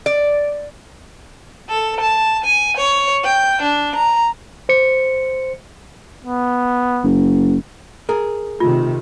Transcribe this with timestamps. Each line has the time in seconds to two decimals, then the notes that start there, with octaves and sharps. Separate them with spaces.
0.06 D5
1.69 A4
2.00 A5
2.45 G#5
2.77 C#5
3.24 G5
3.62 D4
3.96 A#5
4.69 C5 C#7
6.24 B3
7.04 F#1
8.09 G#4 A#4
8.60 C3 D#3 A3 F4